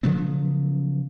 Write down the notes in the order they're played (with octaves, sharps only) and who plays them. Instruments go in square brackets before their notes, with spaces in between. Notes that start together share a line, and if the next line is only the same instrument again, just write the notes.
[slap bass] C#3 F3 F#3 B3